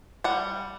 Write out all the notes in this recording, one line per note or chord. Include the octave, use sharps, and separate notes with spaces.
G3 F#5